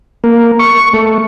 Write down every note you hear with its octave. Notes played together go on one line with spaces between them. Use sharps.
A#3
C#6
A3